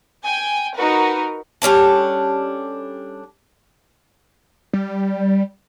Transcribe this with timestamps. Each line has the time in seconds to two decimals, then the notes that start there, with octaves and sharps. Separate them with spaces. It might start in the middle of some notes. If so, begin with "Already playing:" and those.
0.23 G5 G#5
0.75 D#4 F#4 A#4 B4
1.62 G3 C#4 D4 A4
4.73 G3